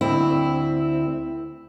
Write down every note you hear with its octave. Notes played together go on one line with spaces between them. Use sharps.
D2 C4 E4